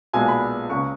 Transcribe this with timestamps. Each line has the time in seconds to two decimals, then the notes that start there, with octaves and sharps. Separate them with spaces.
0.13 B1 A#2 G#3 B3 G#5
0.28 B5
0.69 C#2 C#3 G#3 C#6